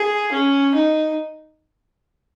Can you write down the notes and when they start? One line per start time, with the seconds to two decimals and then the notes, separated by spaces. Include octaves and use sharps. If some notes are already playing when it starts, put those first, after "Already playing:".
Already playing: G#4
0.32 C#4
0.75 D#4